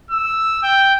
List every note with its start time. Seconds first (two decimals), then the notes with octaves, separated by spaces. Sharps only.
0.11 E6
0.63 G5